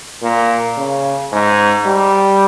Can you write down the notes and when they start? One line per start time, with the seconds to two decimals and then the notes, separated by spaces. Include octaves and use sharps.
0.22 A#2
0.77 C#3
1.32 G#2
1.86 G3